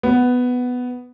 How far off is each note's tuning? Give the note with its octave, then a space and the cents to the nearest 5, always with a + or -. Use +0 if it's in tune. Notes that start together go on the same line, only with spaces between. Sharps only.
B3 +5